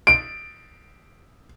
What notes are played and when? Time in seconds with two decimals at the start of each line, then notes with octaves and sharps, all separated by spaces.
0.07 D7